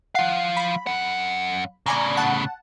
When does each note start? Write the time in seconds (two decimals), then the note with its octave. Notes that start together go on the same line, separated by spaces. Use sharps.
0.15 F3 F5 F#5 C7
0.57 B5
0.87 F#2 F#5
1.86 A2 C#3 D5 G#5 A#5
2.17 F#5 A5